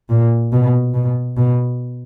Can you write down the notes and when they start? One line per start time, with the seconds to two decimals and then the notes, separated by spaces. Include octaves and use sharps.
0.10 A#2
0.53 B2
0.94 B2
1.37 B2